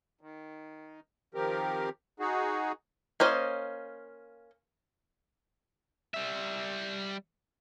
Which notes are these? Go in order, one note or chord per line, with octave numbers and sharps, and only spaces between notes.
D#3
D#3 F3 C4 G4 A#4
D#4 F#4 G#4
A#3 C#4 C5 D#5
G3 E5